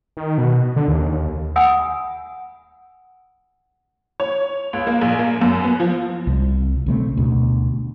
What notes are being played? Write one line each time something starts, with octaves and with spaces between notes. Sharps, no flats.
D#3
B2
D3
D#2
F#5 G#5 B5 D#6 E6
C#5
C#2
A#3
A#1
A#3
F#2
B3
F3
C2
B1 C#3 A3 C4
D2 B2